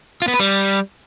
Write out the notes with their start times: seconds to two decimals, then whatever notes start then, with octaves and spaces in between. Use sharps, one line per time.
0.22 F4
0.28 B3
0.34 B4
0.40 G3